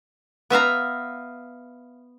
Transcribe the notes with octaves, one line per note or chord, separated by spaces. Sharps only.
B3 E5 F5 A#5